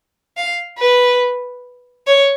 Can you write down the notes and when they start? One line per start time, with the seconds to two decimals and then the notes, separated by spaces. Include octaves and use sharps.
0.37 F5
0.78 B4
2.07 C#5